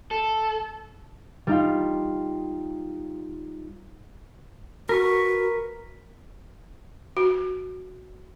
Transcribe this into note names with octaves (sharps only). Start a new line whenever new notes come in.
A4
G3 D#4 F4
F#4 A#4 B4 C#6
F#4